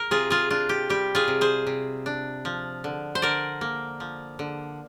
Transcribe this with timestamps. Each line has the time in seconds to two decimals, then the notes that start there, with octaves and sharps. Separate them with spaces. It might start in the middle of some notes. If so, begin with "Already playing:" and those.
Already playing: A#4
0.11 C3 F4 G#4
0.30 F4 G#4
0.50 D4 F4
0.69 G4
0.89 G3 G4
1.15 F4 G#4
1.28 C3
1.41 G#4 C5
1.67 C3
2.06 D4
2.45 F3
2.84 D3
3.15 C5
3.22 D3 A#4 D5
3.61 A#3
4.00 F3
4.39 D3